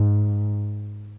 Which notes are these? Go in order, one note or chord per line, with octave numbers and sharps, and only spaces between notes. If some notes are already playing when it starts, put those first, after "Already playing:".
Already playing: G#2